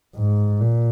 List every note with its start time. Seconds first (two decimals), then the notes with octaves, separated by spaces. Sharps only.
0.16 G#2
0.60 A#2